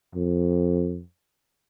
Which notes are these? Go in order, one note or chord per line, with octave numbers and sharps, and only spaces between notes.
F2